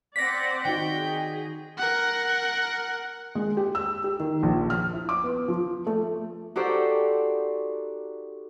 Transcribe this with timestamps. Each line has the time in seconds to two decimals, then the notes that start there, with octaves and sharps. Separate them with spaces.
0.16 C4 D5 F#5 A#6 B6
0.65 D#3 D#4 F#4 G5
0.97 G#4
1.78 A#4 F#5
3.35 G#3
3.57 G4
3.75 E6
4.04 G4
4.20 D#3
4.43 A#1
4.70 F6
4.93 E4
5.09 D6
5.24 B3
5.48 F3
5.87 A3
6.56 D#4 F#4 G4 A4 C5 D5